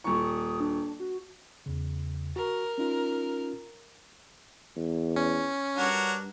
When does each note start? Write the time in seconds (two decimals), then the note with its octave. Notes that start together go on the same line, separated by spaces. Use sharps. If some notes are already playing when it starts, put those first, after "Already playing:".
0.04 D#1 C#6
0.24 D#6
0.60 D4
1.00 F#4
1.66 E2 C#3
2.36 F#4 A#4
2.78 C#4 D#4 F4
4.76 E2
5.16 C#4
5.77 G2 D4 F#4 A#4 C#5